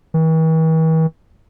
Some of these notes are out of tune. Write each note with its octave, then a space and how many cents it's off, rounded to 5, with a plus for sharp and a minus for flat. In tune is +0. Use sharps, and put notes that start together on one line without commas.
E3 -45